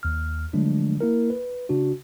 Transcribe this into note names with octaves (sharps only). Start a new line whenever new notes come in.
D#2 F6
D3 F3 F#3 G#3 A3 D4
A#3 E4 A#4
B4
C#3 D4 F#4